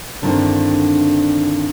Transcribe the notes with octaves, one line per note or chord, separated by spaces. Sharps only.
G2 D3 D#3 C4 E4